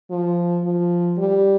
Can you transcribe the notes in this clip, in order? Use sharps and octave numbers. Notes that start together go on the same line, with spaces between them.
F3
F3
G3